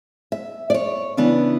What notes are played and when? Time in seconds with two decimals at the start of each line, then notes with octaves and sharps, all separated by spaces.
0.32 E5
0.70 D5
0.74 C#5
1.17 C#3 E3 B3 D4 B4